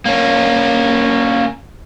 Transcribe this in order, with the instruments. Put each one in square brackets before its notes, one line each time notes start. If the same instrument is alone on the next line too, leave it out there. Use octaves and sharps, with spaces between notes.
[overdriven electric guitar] A#3 C#4